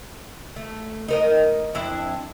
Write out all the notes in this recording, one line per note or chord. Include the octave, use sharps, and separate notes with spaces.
A3
D#4 A#4 D#5
F2 D4 E4